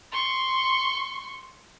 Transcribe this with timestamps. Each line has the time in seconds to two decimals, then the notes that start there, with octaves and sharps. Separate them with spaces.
0.12 C6 C#6